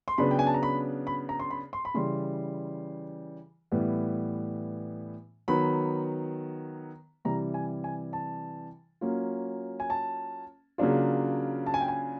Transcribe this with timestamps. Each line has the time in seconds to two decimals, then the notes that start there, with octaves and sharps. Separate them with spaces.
0.08 C6
0.18 C#3 F#3 B3 D4 B5
0.31 G5
0.39 G#5
0.47 A5
0.54 A#5
0.63 B5
1.07 B5
1.29 A#5
1.39 C6
1.50 B5
1.73 C6
1.85 B5
1.94 C#3 E3 G3 C6
3.72 A2 E3 G3 B3
5.48 D#3 F#3 B3 B5
7.25 C3 E3 G3 A#5
7.54 G#5
7.84 G#5
8.13 A5
9.01 F#3 A#3 C#4 F4
9.80 G#5
9.90 A5
10.78 C#3 F#3 A#3 D4 F4
11.66 A5
11.74 G#5
11.81 G5
11.88 G#5